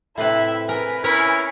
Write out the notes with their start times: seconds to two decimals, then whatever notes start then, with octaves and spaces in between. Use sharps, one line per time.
0.18 A2 C3 E4 B4
0.69 A#4 B4 G#5
1.04 C#4 E4 A#4 C#5